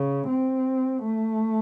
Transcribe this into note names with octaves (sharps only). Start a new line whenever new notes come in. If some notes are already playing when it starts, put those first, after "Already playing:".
Already playing: C#3
C4
A3